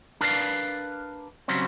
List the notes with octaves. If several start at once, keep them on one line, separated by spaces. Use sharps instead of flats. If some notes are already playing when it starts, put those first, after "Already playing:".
D4 A#4 B4 D5 F5
C#3 F#3 G3 C4 C#4